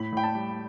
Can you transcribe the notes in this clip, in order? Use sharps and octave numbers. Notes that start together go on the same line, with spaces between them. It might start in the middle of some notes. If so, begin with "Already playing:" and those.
Already playing: A2 B5
A2 G5
A5
G3